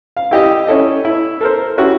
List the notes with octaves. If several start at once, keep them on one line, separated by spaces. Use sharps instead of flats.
F5
E4 G4 D#5
C#4 E4 A4 D#5
E4
A4 A#4 C5
C#4 E4 F#4 G4